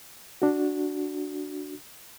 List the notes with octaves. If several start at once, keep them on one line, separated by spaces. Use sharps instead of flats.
D4 F#4